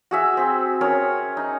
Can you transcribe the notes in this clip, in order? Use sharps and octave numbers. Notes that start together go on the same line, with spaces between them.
F#4 G#4 E5
C4 G#4
C#4 G#4 A#4 C#5
D#4